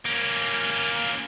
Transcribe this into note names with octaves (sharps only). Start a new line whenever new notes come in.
A#3 C#4